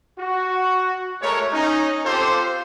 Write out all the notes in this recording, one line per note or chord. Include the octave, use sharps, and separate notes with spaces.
F#4
G#3 A3 A#4 C#5
C#4 D#4
C4 F4 G4 A4 C5